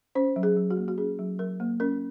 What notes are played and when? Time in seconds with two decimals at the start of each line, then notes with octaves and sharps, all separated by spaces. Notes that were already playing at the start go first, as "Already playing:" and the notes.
0.15 C#4 C5
0.36 F#3
0.43 G#4
0.57 F#3
0.71 F#4
0.77 A#3
0.88 F#4
0.98 C#4 G#4
1.19 F#3
1.39 F#3 A#4
1.60 A#3
1.80 C#4 A#4